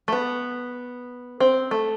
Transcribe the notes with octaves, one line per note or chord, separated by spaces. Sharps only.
A3
B3
C4
A3